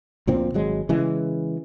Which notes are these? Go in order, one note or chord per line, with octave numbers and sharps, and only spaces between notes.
D2 A#2 F3 C4
G#1 F#3 G#3
C#3 E3 G#3